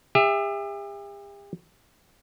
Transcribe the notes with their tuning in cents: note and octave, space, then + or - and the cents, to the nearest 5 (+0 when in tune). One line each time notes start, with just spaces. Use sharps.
G4 +45 E5 +0